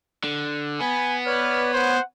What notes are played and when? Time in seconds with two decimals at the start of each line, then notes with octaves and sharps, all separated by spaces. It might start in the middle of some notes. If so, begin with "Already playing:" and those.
0.24 D3
0.81 B3 G#5 B5
1.26 B4 C#5 D5 F6
1.74 C5 F#5